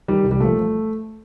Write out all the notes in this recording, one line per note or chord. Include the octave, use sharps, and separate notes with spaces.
D#3 G3
C2
G3
A#2 F3 A3